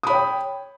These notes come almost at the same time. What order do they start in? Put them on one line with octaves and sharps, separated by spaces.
D#6 B5 C#5 G5